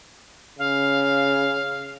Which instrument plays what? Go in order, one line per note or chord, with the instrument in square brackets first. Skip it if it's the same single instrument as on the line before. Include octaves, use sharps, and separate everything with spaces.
[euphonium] C#3 [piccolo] F5